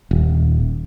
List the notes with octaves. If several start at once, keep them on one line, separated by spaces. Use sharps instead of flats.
D#1